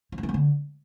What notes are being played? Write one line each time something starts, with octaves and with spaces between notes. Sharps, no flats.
F3
F#3
E3
G#3
D3